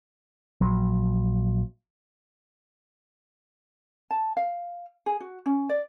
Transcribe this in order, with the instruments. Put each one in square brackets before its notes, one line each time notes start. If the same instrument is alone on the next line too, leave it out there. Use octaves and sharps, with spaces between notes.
[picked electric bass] A#1 F#3
[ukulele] A5
F5
G#4
F#4
C#4
D5